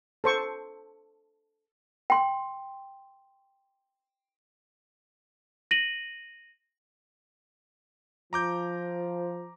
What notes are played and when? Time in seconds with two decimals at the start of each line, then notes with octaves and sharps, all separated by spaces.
0.24 A4 C5 C#6
2.10 G5 C6
5.71 A#6 D#7 F#7
8.33 F3 A#5 D6 G6